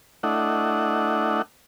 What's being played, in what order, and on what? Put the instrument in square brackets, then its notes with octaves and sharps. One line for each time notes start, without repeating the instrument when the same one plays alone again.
[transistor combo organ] A3 D4 E4 D#5 F#5